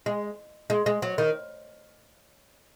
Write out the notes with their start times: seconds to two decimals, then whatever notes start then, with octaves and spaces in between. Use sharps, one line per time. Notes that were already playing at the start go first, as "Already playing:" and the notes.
0.06 G#3
0.70 G#3
0.86 G#3
1.02 F#3
1.18 D#3